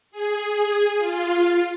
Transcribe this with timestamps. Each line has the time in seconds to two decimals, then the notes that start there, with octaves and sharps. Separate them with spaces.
0.11 G#4
0.98 F4